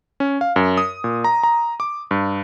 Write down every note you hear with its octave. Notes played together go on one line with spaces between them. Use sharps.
C#4
F5
F#2
D#6
A#2
A#5
A#5
D6
G2